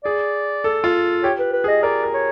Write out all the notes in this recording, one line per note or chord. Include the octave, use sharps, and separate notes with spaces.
G#4 D5
A4
F4
G4 C#5
B4
B4
G#4
D#5
A#4 D5
A#4
C#5